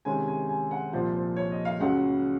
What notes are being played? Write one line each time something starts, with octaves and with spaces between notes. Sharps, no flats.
C3 D#3 G#3 C#4 G#5
G#5
G#5
F#5
C2 A#2 F3 C5
C5
C#5
D#5
F5
C#2 C#3 F#3 F#5